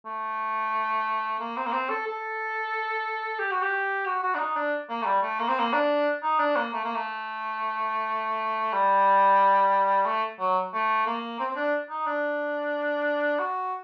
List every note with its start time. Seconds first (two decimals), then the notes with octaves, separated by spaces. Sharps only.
0.05 A3
1.39 A#3
1.57 C4
1.66 A#3
1.72 C4
1.89 A4
2.06 A4
3.39 G4
3.51 F#4
3.62 G4
4.06 F#4
4.23 F#4
4.35 D4
4.39 D#4
4.56 D4
4.89 A#3
5.02 A3
5.06 G3
5.22 A3
5.39 A#3
5.48 C4
5.59 A#3
5.73 D4
6.23 D#4
6.39 D4
6.56 A#3
6.73 A3
6.84 A#3
6.95 A3
8.73 G3
10.06 A3
10.40 F#3
10.73 A3
11.06 A#3
11.39 C4
11.51 C4
11.56 D4
11.90 D#4
12.06 D4
13.39 F#4